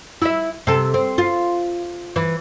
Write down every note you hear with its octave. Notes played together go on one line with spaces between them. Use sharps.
E4 E5
C3 A4
C4
F4
E3